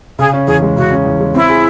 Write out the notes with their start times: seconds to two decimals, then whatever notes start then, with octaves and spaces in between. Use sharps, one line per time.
0.19 C#3 G#4
0.33 C#4
0.48 E2 G#4
0.62 G#3
0.76 C#3 F#4
0.91 C#4
1.06 E2
1.20 G#3
1.35 C4 E4
1.49 G#4